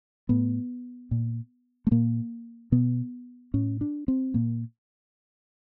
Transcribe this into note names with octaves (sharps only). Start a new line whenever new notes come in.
A2 B3
A#2
A3
A#2 A#3
B2 B3
A2 C#4
D4
C4
A#2 A#3